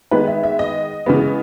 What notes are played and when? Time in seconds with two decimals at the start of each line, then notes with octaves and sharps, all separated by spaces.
0.11 D#3 G#3 B3 B4
0.28 E5
0.44 E5
0.59 D#5
1.06 C#3 E3 G#3 B3